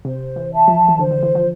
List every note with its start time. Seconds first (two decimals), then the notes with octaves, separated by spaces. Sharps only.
0.05 C3 C5
0.36 E3
0.52 E5 A5
0.68 F3
0.89 E3
0.99 D3 C5
1.11 D3
1.23 E3
1.35 F3